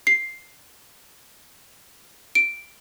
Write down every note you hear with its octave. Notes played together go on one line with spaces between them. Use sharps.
C7
D7